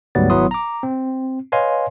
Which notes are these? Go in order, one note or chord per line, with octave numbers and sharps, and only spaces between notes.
D2 G#2 F#3 G3 B3 A6
G#1 F#3 B3 E4 C6 D#6
A#5 D6
C4
B4 C#5 D#5 F5 G#5 C6